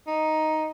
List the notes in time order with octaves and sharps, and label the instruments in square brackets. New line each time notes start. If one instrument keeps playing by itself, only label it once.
[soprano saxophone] D#4